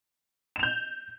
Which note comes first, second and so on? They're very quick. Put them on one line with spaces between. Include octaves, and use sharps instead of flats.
E7 F7 G6